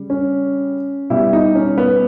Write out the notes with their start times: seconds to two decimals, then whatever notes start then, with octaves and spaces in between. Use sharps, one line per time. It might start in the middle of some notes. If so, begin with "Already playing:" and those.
Already playing: C#3 G3
0.10 C#4
1.10 B2 G3 E4
1.33 D#4
1.55 C#4
1.78 B3